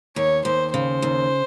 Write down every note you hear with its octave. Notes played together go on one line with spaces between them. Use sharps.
D#2 C#5
D#2 C5
C#3 C5
D#2